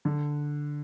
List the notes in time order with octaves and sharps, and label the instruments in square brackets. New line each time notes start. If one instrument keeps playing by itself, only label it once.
[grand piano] D3